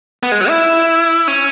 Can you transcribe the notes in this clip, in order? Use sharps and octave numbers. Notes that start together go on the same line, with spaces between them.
B3
G#3
F#3
E4
C#4